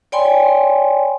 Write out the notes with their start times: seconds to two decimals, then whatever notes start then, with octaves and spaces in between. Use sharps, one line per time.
0.12 C#5 D5 G5 G#5 B5 C6